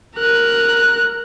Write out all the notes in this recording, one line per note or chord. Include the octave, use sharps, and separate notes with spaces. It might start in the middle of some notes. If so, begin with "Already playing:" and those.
A#4 F#6